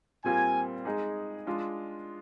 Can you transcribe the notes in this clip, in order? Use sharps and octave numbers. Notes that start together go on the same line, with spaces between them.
A#2 G3 C4 F4 A#4 G#5
G#3 D#4 G#4
G#3 D4 F4